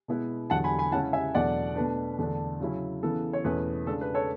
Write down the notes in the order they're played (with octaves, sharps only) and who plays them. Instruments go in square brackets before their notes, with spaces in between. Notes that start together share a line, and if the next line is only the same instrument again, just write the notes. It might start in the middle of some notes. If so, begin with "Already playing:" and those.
[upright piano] B2 G#3 B3 E4
E2 D3 F#3 F#5 A5
G#5 B5
G#5 B5
C#3 G#3 C#4 E4 F#5 A5
E5 G#5
E2 B2 F#3 A3 D4 D5 F#5
B2 A3 D4 B4
E2 D3 A3 D4
C#3 F#3 C#4 E4
C#3 E3 B3 A4
C#5
E2 B2 A3 C#4 E4 B4
C#3 G#3 D4 A4
B4
A4 C#5